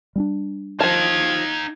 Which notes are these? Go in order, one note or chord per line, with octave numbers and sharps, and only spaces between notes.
G3 C4 D4
F3 D#4 F5 A5 G#6